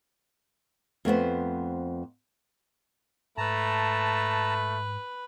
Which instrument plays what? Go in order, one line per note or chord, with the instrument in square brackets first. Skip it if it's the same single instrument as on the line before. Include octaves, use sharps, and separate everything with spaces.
[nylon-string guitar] F2 A3 B3 C5
[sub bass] G#2 [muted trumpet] A3 [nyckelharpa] B4 [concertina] A5 A#5